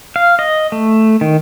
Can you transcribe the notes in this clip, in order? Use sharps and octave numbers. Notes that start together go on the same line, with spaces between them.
F5
D#5
A3
D#3